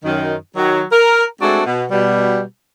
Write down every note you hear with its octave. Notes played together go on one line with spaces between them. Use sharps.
F#2 D#3
D#3 F#3
A#4
G#3 A3 C4 D4 F#4
B2
B2 G3